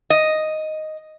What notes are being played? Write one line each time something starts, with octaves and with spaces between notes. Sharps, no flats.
D#5